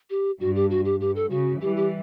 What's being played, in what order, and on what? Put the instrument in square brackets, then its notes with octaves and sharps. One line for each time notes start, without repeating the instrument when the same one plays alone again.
[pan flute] G4
[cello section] G2 [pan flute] F#4
[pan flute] G4
F#4
G4
[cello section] G2 [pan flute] G4
[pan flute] A4
[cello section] C#3 [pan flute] F#4
[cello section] E3 G3 [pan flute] G4
[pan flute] G4